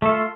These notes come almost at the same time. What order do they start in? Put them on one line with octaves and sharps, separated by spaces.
A3 A4 F4